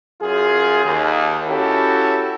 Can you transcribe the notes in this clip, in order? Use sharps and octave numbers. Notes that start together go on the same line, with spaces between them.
F#2 F4 G#4
D#2
C#4 E4 F#4 G4 A4